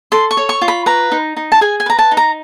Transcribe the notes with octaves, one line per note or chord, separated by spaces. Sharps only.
A4 C6
C#6
C#5
C#6
F4
B5
B4 A#5
D#4
D#4
A5
G#4 G#5
G#5
B4 A#5
A5
D#4
A#5